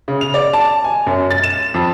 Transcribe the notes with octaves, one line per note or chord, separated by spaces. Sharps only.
C#3
F7
D5
A5
G#5
F#2
A6
E7
F2